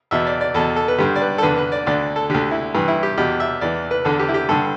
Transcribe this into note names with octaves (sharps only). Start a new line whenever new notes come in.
E2 B2 E5
D5
D5
E2 B2 A4
A4
B4
G2 D3 G4
D5
B4
A4
E2 D3 B4
B4
D5
D2 D3 D5
A4
D2 D3 G4
E4
G2 E3
E4
G4
E2 B2 G4
E5
E2 E3 D5
B4
E2 D3 A4
G4
E4
G4
G2 D3 A4